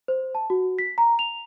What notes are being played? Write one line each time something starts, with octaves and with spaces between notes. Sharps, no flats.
C5
A5
F#4
B6
A#5
F7